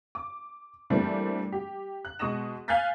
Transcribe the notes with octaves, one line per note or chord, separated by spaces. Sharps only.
D6
E3 G3 A3 A#3 C4 D4
G4
F#6
B2 G#3 C#6 D#6 A#6 E7
F5 G#5 F#6 G6 A6 B6